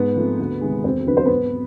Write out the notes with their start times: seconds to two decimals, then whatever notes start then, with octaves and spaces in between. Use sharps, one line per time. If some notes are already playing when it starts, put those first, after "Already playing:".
Already playing: G#2 B3 B4
0.16 F3 A3 C4
0.40 D2
0.61 C3 D#3 G#3 C4
0.84 E1 C4 C5
1.07 D2 D3 F#3 B4
1.17 C5
1.26 G#1 B3 B4